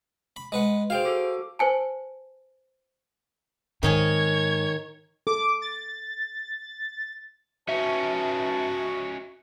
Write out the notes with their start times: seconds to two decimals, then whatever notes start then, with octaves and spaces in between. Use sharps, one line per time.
0.36 B5
0.52 G#3 B4 F#5
0.90 F#4 G#4 C5 F5 G5
1.05 F#4 A4 D6
1.59 B4 C5 G#5 A5
3.83 G#2 D#3 D#4 C#5 G#5 G#6
5.27 A4 D6
5.62 A6
7.69 C#4 D#4 F#4 B4 E5 A5